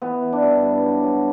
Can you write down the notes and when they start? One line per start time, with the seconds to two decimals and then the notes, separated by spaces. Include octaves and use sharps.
0.02 E3 B3
0.22 E3
0.32 D4
0.42 G2 E4
0.62 G2
0.83 F#3
1.04 F#3